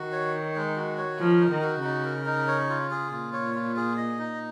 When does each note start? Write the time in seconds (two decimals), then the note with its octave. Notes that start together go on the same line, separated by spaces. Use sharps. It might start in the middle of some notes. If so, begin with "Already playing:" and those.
Already playing: D#3 F#4
0.12 C#5
0.33 D#4
0.55 G#3
0.76 F#4
0.98 C#5
1.19 F3 A#4
1.41 D#4
1.51 D#3
1.62 F#4
1.83 C#3 D#4
2.05 A#4
2.26 D#4
2.48 C#5
2.69 F4
2.91 G#4
3.12 A#2 F4
3.33 C#5
3.55 F4
3.76 G#4
3.97 D#5
4.19 D#4